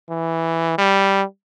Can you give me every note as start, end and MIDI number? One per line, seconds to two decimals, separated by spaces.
0.10 0.76 52
0.78 1.23 55